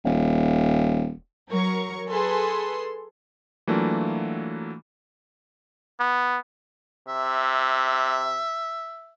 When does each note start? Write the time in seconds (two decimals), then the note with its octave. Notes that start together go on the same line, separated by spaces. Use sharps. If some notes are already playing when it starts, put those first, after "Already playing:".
0.05 D#1
1.50 F#3 A#4 C#6
2.11 G#4 A4 B4 C6
3.67 E3 F#3 A3 A#3 D4 F4
6.00 B3
7.08 C3 E5